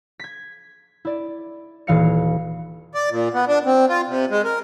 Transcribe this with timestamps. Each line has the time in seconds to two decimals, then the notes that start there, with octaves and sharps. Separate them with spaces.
0.20 G#6 B6
1.05 E4 D5
1.87 D#1 E3 F5 C#7
2.95 D5
3.10 A#2
3.34 B3
3.48 D4
3.66 C4
3.89 F4
4.07 C3
4.30 G#3
4.44 A#4